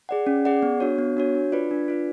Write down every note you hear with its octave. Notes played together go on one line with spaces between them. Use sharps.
G#4 D5 F#5
C#4
G#4 D5 F#5
B3
D4 F#4 C#5
B3
D4 F#4 C#5
D4
F4 B4 D5
D4
F4 B4 D5